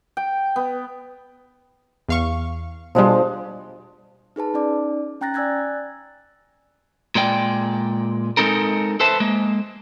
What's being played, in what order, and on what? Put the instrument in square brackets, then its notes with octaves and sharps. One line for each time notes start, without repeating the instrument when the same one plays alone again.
[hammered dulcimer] G5
B3
[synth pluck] E2 F5 C#6
[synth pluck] B2 G3 [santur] F3 G#3 D4
[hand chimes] D#4 G#4 B4 A5
C#4 D#4 D5 D6
C#4 G5 A#5 F#6 A6 A#6
D5 G#5 E6 F#6 G#6 A6
[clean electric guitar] A#2 G#3 D5 G5
G#3 C4 D#4 A4 A#4
A4 B4 C5 E5 A5
G#3 A#3